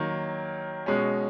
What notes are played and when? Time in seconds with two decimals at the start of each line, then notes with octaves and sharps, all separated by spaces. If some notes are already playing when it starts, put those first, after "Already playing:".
Already playing: D#3 F#3 A#3
0.86 B2 G#3 C#4